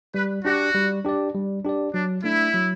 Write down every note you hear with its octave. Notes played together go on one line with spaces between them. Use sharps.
G3 B4
D4 F#4 G4 D5
G3
D4 G4 D5
G3
D4 G4 D5
F#3 D4
A3 D4 E4
F#3